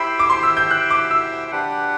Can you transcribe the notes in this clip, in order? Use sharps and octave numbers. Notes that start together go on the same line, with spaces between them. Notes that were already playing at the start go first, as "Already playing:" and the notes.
Already playing: E4 G4 C5 E5 G5 B5
D6
C6
E6
G6
F#6
D6
E6
D4 G4 B4 F#5